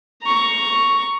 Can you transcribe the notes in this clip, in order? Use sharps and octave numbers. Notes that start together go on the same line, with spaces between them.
A#5 C#6